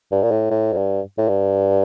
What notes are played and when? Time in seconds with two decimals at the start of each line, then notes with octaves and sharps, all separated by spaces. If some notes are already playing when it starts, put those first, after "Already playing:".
0.12 G2
0.23 A#2
0.31 A2
0.50 A2
0.72 F2
0.77 G2
1.18 A2
1.28 G2